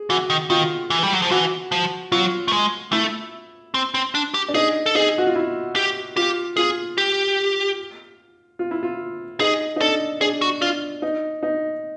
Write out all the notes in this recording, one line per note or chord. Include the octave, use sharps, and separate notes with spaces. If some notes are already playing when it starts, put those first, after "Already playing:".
Already playing: G#4
E3 F#4
D#3
D#3 F4
E3
G3
F#3
F3
E3 F#4
F3
F#3 F4
A3
G#3
A3 E4
C4
C4
D4
G4
D4
D#4 G#4
A4
D#4 G#4
F#4
F4
E4
G4
F4 G4
F4 G#4
G4
F4
E4
F4
D#4 G#4
D#4
D4 A4
D4 G#4
F#4
D4 F4
D#4
D#4